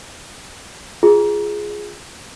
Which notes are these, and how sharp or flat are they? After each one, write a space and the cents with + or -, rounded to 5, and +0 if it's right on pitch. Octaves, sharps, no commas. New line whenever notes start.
F4 +0 G#4 +0